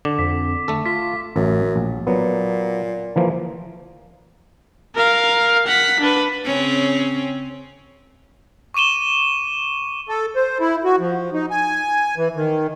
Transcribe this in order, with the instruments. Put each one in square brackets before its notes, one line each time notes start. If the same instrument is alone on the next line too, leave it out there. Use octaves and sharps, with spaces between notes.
[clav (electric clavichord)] D3 [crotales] D6
[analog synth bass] F2 [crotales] B6
[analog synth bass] D3 [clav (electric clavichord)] A3 A4
[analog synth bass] F4 [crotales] B6
[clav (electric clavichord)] A1 [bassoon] F#2
[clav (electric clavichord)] A#1
[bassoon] A#2 [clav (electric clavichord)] F#3 B3
[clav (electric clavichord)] E3 F3 A#3
[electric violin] A#4 F5
F#5 B6
D4 B4
[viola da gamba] C#3 C4 C#4
[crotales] C#6 D6 D#7 E7 G7
[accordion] A4
C5
E4
F#4
F3
D#4
G#5
E3
D#3